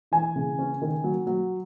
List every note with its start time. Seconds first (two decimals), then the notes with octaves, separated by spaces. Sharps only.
0.12 E3 G#5
0.36 C#3
0.59 C#4
0.82 D#3
1.04 F#3
1.27 F#3